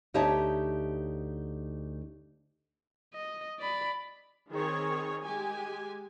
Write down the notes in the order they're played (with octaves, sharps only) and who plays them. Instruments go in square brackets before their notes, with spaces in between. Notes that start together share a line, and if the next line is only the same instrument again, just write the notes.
[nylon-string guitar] D2 D#4 G4 C#5 E5 A5
[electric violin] D#5
D5 B5
[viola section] D#3 C4 G#4 C#5
G#3 G4 G#5